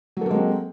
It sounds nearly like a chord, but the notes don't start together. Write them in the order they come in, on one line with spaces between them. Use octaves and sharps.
F#3 A4 A#3 G#3 C4